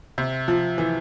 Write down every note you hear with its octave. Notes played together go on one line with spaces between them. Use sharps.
C3
F3
E3